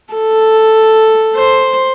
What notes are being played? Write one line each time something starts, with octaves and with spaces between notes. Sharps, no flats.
A4
C5